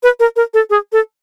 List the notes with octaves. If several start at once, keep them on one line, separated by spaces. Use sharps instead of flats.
B4
A#4
A#4
A4
G#4
A4